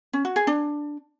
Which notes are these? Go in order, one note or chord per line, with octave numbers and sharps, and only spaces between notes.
C#4
F#4
G#4
D4